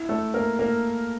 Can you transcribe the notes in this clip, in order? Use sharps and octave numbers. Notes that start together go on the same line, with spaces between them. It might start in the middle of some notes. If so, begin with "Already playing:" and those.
Already playing: E4
A3 A4
A#3 A#4
A#3 A#4